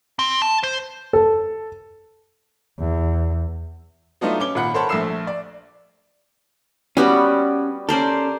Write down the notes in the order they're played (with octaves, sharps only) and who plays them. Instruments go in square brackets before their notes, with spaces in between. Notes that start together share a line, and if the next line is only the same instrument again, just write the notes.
[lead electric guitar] C4
A5
C5
[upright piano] A4
[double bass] E2
[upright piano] F#3 A3 B3 D4 D#4 F4
C#4 D6 G7
G#1 A#2 F#5 B5 F#6
A#4 C5 C#5 F#5 A5 B5
A#1 A3 E5 E6 C7 E7
D5
[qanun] G3 B3 F#4 [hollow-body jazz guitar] C#4 G4
[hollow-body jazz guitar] C#4 A4 [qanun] A#4 C5 D5